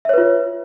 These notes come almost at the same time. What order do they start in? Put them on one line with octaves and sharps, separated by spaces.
E5 C#5 B4 F4